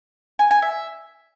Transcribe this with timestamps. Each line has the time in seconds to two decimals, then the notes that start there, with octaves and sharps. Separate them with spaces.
0.39 G#5
0.51 G#5
0.62 E5